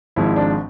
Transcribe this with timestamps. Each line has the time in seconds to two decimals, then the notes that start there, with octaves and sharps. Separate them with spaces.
0.16 G#1 G#2 F3 E4
0.36 D4